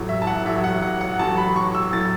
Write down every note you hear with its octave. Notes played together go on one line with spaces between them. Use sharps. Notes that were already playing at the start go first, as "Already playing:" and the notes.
Already playing: A1 A2 F#3
E5
A5
F#5
A1 A2 F#3 E5
F#5
F#5
F#5
A1 A2 F#3 A5
B5
C#6
E6
A2 F#3 A6